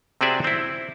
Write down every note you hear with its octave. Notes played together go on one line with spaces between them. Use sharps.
C3 C4 F#4 G#4 D5 E5
C4 E4